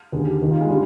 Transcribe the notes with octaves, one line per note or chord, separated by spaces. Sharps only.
D#2 D3 G#4
G4
D#2 D#3
F4
G#3
D3 G3